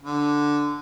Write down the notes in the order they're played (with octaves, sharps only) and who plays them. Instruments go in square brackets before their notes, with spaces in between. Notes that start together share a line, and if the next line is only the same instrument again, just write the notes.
[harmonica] D3